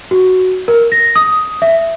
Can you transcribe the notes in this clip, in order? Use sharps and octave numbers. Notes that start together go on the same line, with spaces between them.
F#4
A#4
A#6
D#6
E5